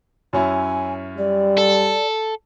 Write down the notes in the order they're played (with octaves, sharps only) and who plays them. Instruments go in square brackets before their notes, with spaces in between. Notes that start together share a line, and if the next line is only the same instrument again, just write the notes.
[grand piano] F#2 C#4 E4 [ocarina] G#5
[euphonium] G3 [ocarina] D5
[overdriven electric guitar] A4